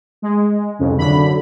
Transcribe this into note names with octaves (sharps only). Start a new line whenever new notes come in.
G#3
C2 F2 C#3
F#2 D3 B5